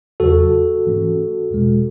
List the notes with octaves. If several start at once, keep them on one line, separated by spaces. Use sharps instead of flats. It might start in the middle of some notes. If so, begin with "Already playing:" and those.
E2 C#3 F#3 F#4 A4
G#2 E3 A3 C#4
E2 B2 G#3